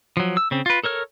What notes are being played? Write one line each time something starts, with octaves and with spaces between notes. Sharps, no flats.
F3 F#3
E6
C#3 C4
F4 B4
A4 A#4 C#5 F6